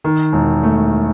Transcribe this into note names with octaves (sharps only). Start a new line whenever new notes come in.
D#3
E1
A3